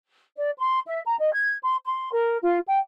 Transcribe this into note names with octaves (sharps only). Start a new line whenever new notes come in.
D5
C6
E5
A#5
D#5
G#6
C6
C6
A#4
F4
G5